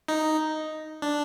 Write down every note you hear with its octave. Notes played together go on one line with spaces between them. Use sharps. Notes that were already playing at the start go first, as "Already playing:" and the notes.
D#4
D4